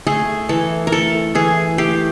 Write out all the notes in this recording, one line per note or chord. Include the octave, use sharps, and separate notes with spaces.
A3 G#4
E3 A4
A#4
A3 A4
E3 G#4
A3 G4